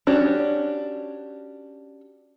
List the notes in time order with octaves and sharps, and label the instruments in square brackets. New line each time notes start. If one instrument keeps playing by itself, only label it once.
[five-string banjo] C#4 D4 F#4 G4 C#5